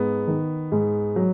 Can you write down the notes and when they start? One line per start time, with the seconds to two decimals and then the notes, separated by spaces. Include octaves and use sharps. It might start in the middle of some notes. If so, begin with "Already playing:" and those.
Already playing: G#2 B3
0.28 D#3
0.72 G#2
1.16 F#3